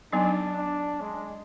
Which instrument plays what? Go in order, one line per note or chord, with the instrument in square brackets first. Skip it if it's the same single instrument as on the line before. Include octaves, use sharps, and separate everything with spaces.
[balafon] F#3 B3 D#4 [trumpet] D4
[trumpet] D4
G#3